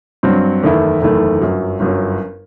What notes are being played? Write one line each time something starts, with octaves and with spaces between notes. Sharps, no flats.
G2 F#3 C4
F#1 E2 D#3 A3 E4
F#1 E2 D#3 A3 E4
G1 F#2 F#3
G1 F#2 F#3